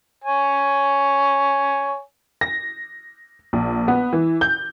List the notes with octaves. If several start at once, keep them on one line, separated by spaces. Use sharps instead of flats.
C#5 G#5
A#6
A#1
B3
E3
G6